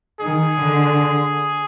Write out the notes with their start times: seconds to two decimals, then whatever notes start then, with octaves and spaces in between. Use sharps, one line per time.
0.20 D#3 G#4
0.60 D3